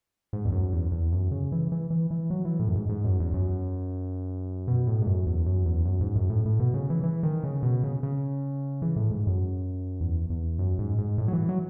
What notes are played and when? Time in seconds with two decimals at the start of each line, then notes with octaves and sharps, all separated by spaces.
0.33 G#2
0.45 E2
0.52 F#2
0.73 E2
0.92 E2
1.12 F#2
1.32 C#3
1.52 E3
1.72 E3
1.90 E3
2.11 E3
2.30 F#3
2.45 E3
2.59 A2
2.67 F#2
2.75 G#2
2.89 G#2
3.04 F#2
3.20 E2
3.34 F#2
4.68 B2
4.87 A2
5.02 G#2
5.07 F#2
5.26 E2
5.46 F#2
5.66 E2
5.85 F#2
6.01 G#2
6.16 F#2
6.30 A2
6.45 A2
6.60 B2
6.74 C#3
6.90 E3
7.03 E3
7.23 D#3
7.44 C#3
7.63 B2
7.83 C#3
8.03 C#3
8.82 E3
8.96 A2
9.11 G#2
9.27 F#2
10.00 E2
10.30 E2
10.59 F#2
10.79 G#2
10.98 G#2
11.18 A2
11.28 F#3
11.33 E3
11.49 F#3